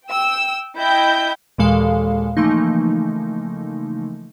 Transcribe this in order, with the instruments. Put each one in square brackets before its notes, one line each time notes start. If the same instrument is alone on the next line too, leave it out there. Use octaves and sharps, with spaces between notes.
[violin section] G5 E6
E4 D#5 G5 G6
[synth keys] D#2 A#2 E3 G#3 A4 F5
C#3 E3 F3 A3 A#3 D#4